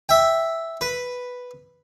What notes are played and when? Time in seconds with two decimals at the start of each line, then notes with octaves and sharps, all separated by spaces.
0.09 E5 G5
0.81 B4